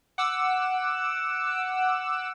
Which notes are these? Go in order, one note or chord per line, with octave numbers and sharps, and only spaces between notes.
F#5 D6 E6